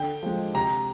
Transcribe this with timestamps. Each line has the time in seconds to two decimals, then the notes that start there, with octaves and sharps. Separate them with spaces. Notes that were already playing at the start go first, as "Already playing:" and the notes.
Already playing: D3 G5
0.23 F3 G#3
0.54 C3 A#5